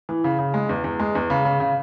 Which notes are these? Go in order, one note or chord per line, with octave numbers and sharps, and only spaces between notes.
E3
C#3
C#3
G#3
E2
E2
G#3
E2
C#3
C#3
C#3